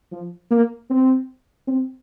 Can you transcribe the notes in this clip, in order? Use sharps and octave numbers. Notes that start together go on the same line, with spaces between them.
F3
A#3
C4
C4